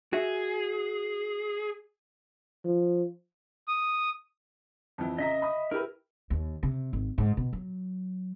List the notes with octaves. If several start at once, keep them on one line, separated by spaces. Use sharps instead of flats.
F#4 G#4 E5
F3
D#6
F2 E3
C#3 D#5 E5 A#5
B5 D#6
E4 G4 A#4 B4
D#2
C3
G#1
G#2
B2
F#3